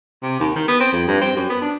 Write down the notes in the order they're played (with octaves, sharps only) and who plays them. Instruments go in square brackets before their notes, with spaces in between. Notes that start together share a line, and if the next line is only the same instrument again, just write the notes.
[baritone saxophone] C3
D#2
D#3
B3
C4
F2
G2
C4
F#2
B3
D4